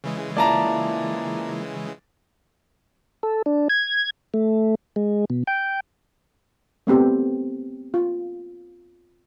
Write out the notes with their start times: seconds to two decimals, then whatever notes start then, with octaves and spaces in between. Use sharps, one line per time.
0.04 C#3 E3 G#3
0.37 A#3 E4 F4 D5 A5 A#5
3.23 A4
3.46 D4
3.69 G#6
4.34 A3
4.96 G#3
5.30 B2
5.47 G5
6.87 A3 B3 C4 G4
7.94 F4